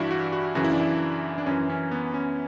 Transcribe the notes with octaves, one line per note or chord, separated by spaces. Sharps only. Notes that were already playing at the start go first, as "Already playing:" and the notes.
Already playing: G2 E3 D4 E4 F#4
F#4
F#4
F#2 C#3 E3 F#4
E4
D4
E4
D4
F#2 E3 C#4
C#4
B3
C#4